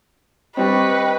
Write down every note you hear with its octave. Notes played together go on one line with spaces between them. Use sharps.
G3 C4 B4 D#5 G5 C#6